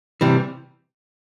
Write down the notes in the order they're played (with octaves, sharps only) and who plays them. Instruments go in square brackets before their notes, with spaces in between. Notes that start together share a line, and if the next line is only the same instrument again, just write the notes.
[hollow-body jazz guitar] C3 E3 G3